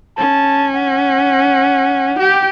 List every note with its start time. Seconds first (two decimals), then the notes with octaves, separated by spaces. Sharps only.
0.17 C#4 A5
0.75 F#5
2.19 G4 G5